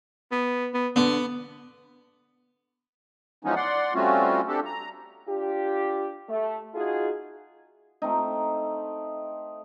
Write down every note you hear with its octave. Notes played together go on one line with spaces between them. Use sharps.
B3
B3
D3 B3
E3 F3 G#3 B3 C#4 D#4
D5 F#5 C6
G3 A3 C4 C#4 F4 F#4
C4 D4 G4 A4
A#5
D4 F4 G4
A3
D#4 F4 F#4 G#4
A3 C4 D#4